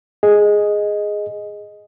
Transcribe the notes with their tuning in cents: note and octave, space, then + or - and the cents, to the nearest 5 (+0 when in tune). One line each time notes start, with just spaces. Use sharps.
G#4 +0 D#5 +0